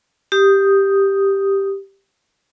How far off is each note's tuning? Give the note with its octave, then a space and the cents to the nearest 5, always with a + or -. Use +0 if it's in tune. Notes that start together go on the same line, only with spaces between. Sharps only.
G4 +0 D#6 +0